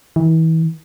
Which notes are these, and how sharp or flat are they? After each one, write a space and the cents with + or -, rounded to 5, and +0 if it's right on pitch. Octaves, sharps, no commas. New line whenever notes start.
E3 -35